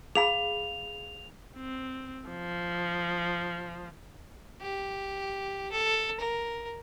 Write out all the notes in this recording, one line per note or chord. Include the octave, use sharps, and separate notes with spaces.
G#4 F5 B5 F7
C4
F3
G4
A4
A#4